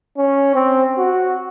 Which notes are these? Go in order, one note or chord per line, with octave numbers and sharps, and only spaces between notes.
C#4
C4
F#4